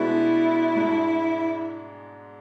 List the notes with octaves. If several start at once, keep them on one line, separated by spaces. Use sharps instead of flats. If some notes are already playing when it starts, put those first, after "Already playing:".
Already playing: B2 G#3 B3 D4 E4
G#2 G#3 D4